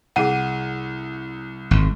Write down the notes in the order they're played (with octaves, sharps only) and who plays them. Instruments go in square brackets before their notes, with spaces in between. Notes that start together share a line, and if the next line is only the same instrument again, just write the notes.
[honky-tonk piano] C2 D#7 [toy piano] G#4 F#5
[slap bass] G#1